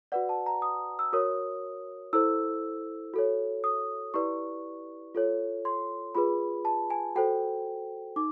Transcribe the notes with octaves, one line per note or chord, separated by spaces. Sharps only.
F#4 B4 D5 F#5
A5
A#5
D#6
E6
F#4 A#4 C#5 D#6
E4 A4 C5 E6
F#4 A4 C#5
D#6
E4 G4 B4 D5 C#6
F4 A4 C#5
C6
F4 G#4 B4 B5
A5
G#5
F#4 A4 C5 G5
D#4 D6